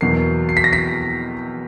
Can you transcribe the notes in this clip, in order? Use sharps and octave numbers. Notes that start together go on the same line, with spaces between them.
E2 B2 F#3 A#3 C7
C7
B6
A#6
B6